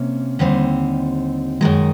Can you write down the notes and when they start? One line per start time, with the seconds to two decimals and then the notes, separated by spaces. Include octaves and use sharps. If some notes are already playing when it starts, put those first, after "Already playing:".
Already playing: C3 A#3 C#4
0.39 D#2 D3 G3 C4 D#4
1.61 F#2 D#3 G#3